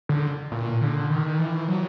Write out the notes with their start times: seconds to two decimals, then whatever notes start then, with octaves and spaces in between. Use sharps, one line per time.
0.09 D3
0.52 A#2
0.81 D3
1.10 D#3
1.39 E3
1.68 F#3